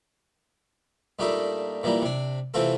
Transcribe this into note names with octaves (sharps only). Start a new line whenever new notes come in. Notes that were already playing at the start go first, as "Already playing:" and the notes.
A#2 G3 A3 D4 D#4 A4
A#2 E3 G3 A#3
C3 D4
C3 E3 A3 C4 F4 A4